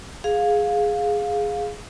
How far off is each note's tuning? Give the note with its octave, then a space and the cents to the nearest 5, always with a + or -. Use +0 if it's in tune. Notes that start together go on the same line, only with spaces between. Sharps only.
G#4 +0 F5 +15